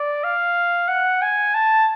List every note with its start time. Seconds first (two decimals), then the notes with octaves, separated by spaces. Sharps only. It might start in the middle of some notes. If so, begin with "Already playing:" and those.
Already playing: D5
0.24 F5
0.88 F#5
1.22 G#5
1.54 A5